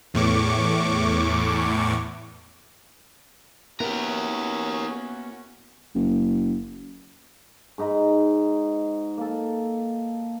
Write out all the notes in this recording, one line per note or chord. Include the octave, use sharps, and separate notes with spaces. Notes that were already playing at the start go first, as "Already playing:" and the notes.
E2 A2 C#6 D6
A#3 B3 C#4 E4 F#4 G4 A#4
F#1
G#2 D#4 A#5 B5
A#3 A4